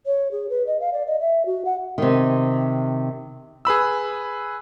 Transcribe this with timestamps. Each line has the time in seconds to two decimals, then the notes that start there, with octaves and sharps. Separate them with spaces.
0.06 C#5
0.32 G#4
0.49 B4
0.67 D#5
0.80 F5
0.93 D5
1.07 D#5
1.20 E5
1.46 F#4
1.65 F#5
1.98 C3 D#3
3.65 G#4 B4 B5 E6